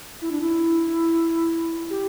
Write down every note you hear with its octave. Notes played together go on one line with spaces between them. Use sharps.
E4
D4
E4
G4